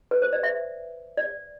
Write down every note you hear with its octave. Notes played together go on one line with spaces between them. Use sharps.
B4
C5
D5
E5
D5